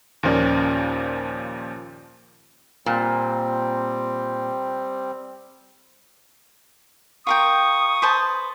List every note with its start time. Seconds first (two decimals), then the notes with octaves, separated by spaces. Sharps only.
0.23 D#2 A#2 F3 C#4 A#4 D5
2.86 A#2 G3 C4
7.27 F4 A#4 G5 C#6 D#6
8.02 B4 C5 A5